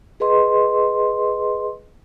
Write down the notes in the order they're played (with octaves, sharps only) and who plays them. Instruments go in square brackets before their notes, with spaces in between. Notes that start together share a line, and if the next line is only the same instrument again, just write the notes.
[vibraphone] G#4 B4 D#5 C6